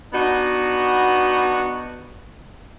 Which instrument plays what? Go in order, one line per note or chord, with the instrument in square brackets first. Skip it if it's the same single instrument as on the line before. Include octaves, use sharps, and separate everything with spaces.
[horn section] B3 D4 D#4 F#4